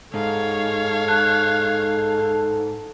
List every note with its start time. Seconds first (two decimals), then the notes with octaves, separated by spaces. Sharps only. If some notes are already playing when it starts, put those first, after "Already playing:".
0.14 G#2 A4 C#5 F5
1.08 A5 F#6